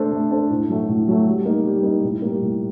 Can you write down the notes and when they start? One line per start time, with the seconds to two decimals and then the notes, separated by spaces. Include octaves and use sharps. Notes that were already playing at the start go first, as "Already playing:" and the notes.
Already playing: A3 D4 A4 C5
0.12 A3
0.31 D4 A4 C5
0.50 A2
0.69 F#3 A3
0.88 A2
1.08 F#3 A3
1.27 G3
1.46 A#3 D#4
1.65 G3
1.83 A#3 D#4
2.03 A2
2.22 G3 A#3
2.41 A2